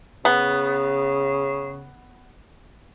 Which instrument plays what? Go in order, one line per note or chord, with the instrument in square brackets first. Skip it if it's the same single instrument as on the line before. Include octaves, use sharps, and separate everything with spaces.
[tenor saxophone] C#3 [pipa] B3